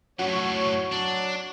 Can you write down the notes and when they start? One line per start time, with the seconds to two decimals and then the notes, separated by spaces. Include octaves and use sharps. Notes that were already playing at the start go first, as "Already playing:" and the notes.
0.19 F#2 A2 F#4 C#5
0.92 F#3 D4